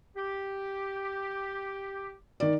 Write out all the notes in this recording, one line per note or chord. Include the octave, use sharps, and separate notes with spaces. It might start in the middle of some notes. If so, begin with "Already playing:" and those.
G4
D#3 D5